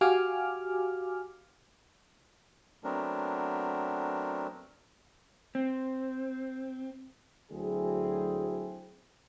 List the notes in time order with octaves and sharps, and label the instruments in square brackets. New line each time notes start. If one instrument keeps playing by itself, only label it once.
[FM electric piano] F#4 G4 F5 G#5 D6 F6
[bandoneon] F#3 A3 B3 C4 D4 A#4
[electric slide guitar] C4
[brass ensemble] D2 F#3 C4 E4 G#4